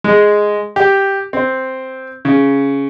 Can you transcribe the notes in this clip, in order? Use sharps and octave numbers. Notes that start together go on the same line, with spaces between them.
G#3
G4
C4
C#3